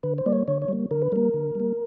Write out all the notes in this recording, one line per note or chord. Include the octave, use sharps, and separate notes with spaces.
D3 B4
C5
G3 A#3 D5
C#5
D3 C#5
C#5
G3 A#3
D3 A#4
B4
G3 A#3 A#4
D3
G3 A#3